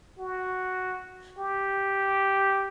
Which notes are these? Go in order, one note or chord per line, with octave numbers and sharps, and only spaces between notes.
F#4
G4